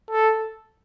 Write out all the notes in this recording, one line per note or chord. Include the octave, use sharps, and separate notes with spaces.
A4